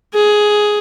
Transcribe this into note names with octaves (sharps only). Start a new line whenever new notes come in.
G#4